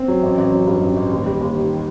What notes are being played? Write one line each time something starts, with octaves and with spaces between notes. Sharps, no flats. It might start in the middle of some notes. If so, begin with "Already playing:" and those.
Already playing: C4
F#3
A1
A1
F#3
G2
A1
A1
D#2
G3
D#2
D#3